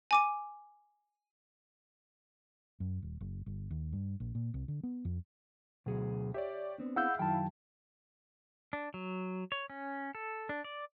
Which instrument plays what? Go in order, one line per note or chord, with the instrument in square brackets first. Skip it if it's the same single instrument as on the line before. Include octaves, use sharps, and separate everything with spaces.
[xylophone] G#5 D6 D#7
[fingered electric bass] F#2
D#1
F#1
G1
D#2
G2
A#1
A#2
C2
D3
B3
F2
[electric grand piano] D2 [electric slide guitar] B2 F#3 G#4
[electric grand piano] G4 C#5 D5 [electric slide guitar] E5
[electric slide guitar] B3 C4 D4
[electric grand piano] E4 G#4 F5 [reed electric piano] F#5 E6 G6
[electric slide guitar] F#2 D#3 F#3 [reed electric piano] G5 A5
[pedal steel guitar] D4
F#3
C#5
C#4
A4
D4
D5